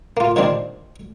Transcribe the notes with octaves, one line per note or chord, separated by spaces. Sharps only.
A#3 F4
A#2 D#3 G3 G#3 C4 D4